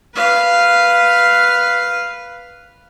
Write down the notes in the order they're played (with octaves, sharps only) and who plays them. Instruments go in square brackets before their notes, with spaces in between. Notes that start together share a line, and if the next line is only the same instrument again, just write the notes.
[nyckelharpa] B4 F5